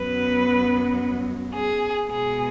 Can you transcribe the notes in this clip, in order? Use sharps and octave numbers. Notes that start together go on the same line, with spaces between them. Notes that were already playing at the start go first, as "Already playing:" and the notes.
Already playing: F#2 F#3 B3 B4
G#4
B2 G#3 B3 G#4